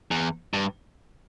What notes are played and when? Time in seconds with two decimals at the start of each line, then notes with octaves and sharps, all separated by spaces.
0.11 E2
0.54 G2